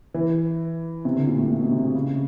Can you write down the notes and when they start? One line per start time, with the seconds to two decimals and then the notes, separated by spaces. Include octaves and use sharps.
0.14 E3
1.05 C3
1.16 D3
1.27 A#2
1.39 A2
1.50 A#2
1.61 B2
1.72 C3
1.83 C3
1.95 C#3